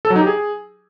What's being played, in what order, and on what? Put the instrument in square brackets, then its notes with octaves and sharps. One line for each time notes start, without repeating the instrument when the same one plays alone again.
[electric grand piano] A4
F#3
D#4
G4
G#4